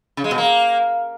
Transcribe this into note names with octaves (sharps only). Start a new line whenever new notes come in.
C#3
G#3
B2
A#3